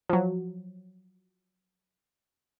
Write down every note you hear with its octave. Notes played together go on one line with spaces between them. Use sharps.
F3 F#3